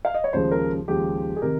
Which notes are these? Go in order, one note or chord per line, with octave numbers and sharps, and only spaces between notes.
F5
D#5
C#5
D#2 C#3 F3 G#3 C5
A#4
D#2 C#3 F3 G#3 G4
G#4
C3 D#3 A#4